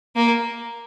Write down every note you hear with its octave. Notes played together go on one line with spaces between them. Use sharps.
A#3